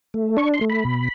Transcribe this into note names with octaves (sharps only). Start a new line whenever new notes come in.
A3
D4 C#6
C6
A3
B5
B2